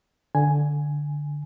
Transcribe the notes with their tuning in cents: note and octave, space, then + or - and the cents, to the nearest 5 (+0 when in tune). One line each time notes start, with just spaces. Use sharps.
D3 +0 G#5 +0